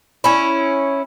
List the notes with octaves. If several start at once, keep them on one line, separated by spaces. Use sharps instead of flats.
C#4 E4